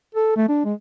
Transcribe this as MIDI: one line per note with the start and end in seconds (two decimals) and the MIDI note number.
0.15 0.33 69
0.37 0.46 57
0.48 0.62 62
0.65 0.73 56